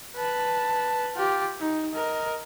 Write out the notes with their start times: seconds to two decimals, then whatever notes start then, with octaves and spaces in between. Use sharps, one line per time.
0.16 B4 A5
1.15 F4 G4
1.59 D#4
1.93 A#4 D#5